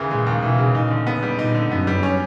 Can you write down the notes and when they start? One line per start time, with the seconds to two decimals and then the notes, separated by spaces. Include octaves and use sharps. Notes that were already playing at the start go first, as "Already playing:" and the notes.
Already playing: D#2 C#3 E3
0.11 A#2 G#3
0.27 D#2
0.43 B2 E3
0.58 C#3
0.75 A#2 D#4
0.90 D3
1.07 B3
1.23 G3
1.39 A#2 D#4
1.55 D3
1.71 F#2 B3
1.87 G3
2.03 C#4